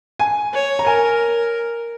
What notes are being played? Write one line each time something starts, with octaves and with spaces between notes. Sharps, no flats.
G#5
C#5
A#5
A#4 G#5